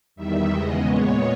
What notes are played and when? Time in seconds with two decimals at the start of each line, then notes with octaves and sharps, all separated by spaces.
0.16 E2 D#3 G3 E5
0.51 E2 C#3 G#3 B3 D#5
0.86 A#2 G#3 B3 C#5